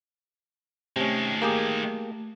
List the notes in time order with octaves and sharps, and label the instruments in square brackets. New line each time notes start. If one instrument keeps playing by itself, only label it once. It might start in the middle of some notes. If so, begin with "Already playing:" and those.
[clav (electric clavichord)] C3 C#4 [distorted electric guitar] D#3 G#3 [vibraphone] A3
[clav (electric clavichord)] A#3 G4 G#4